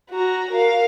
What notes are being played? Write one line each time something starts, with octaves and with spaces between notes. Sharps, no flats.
F#4 A#5
A#4 F5